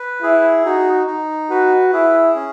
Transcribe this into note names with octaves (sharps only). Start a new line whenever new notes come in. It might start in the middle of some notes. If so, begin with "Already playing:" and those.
Already playing: B4
E4 G#4
D#4 F#4
D#4
F#4 B4
E4 G#4
C#4